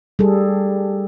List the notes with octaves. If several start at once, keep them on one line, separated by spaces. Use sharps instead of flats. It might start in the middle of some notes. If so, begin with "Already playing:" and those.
G3 G#4 A4